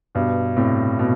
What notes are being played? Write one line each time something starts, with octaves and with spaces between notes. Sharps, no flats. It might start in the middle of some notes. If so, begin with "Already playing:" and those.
G2 B2
A2 C3
B2